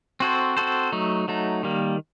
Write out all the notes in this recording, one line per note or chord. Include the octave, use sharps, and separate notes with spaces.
C4 F#4 A4 C5
C4 F#4 A4 C5
F#3 A3 D#4
F#3 A3 D#4
D#3 G3 A#3